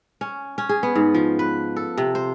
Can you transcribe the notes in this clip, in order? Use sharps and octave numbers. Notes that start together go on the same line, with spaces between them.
C#4
C#4
G#4
B3
G#2
F3
B4
A4
C3
C5